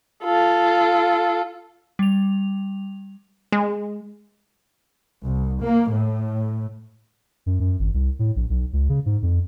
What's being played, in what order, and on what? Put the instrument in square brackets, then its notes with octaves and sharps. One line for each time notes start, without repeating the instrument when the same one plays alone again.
[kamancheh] F4 A4
[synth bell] G3 F7
[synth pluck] G#3
[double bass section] C2
A#3
A2
[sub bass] F#2
F#2
G#1
C2
A2
A#1
B1
C#2
C#3
G#2
F2